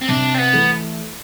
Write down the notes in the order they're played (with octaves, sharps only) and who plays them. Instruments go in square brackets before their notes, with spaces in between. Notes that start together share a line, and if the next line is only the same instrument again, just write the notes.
[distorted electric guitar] C4
[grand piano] C3 [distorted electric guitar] D4
[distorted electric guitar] C4
B3
[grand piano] E3 A3